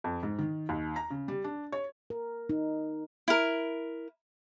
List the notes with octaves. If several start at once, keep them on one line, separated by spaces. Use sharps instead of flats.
F2
G#2
D#3
D#2
A#5
C#3
G3
D4
C#5
A#4
D#4
E4 A#4